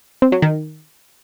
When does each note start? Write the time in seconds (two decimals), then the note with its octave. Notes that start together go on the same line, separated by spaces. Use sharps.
0.22 C4
0.32 F#3
0.42 D#3